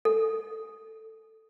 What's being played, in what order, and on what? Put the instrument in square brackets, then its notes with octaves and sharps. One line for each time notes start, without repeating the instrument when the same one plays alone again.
[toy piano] A4